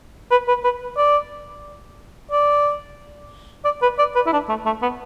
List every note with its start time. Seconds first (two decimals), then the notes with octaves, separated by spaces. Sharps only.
0.31 B4
0.48 B4
0.64 B4
0.97 D5
2.32 D5
3.65 D5
3.82 B4
3.99 D5
4.16 B4
4.26 E4
4.33 D4
4.49 A3
4.66 A3
4.82 B3